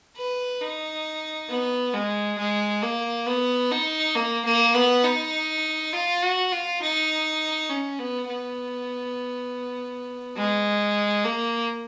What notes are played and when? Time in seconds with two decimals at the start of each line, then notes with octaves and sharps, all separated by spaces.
0.17 B4
0.61 D#4
1.49 B3
1.94 G#3
2.38 G#3
2.82 A#3
3.27 B3
3.71 D#4
4.15 A#3
4.45 A#3
4.74 B3
5.04 D#4
5.93 F4
6.22 F#4
6.52 F4
6.82 D#4
7.70 C#4
7.99 B3
8.29 B3
10.36 G#3
11.25 A#3